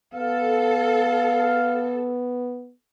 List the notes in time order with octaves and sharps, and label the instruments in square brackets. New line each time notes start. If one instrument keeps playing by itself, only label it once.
[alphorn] B3 [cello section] A4 [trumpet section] F5